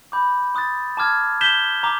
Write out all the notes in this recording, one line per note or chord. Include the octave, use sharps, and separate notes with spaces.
B5 D6 G6
C6 D#6 F#6 A6
A5 D6 F6 G#6
G6 B6 E7 G7
A#5 D6